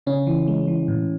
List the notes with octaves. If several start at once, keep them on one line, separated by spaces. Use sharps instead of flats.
C#3 C#4
E3
G#3
E3
A2